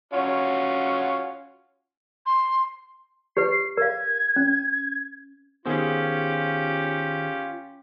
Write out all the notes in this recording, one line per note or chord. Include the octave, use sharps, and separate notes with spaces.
C#4 F4 F#4
C6
G4 B4 C7
A#4 F5 G#6
C#4
D#3 B3 C#4 F4 G4 G#4 C5 F#5